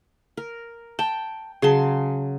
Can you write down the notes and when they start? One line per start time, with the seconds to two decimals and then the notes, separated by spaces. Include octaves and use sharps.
0.37 A#4
0.99 G5 A5
1.62 C#3 F#3 G#4 A5 C6